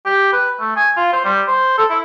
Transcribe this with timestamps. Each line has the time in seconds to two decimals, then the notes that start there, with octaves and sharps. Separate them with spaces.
0.05 G4
0.33 B4
0.60 A3
0.76 G#5
0.97 F4
1.13 C5
1.25 G3
1.48 C5
1.78 A4
1.90 E4